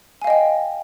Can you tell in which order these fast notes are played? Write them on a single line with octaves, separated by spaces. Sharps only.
G#5 F5 D#5 G5